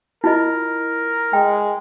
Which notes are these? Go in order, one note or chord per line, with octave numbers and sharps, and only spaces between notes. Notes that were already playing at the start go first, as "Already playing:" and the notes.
E4 F4 A#4 D#5
G#3 G5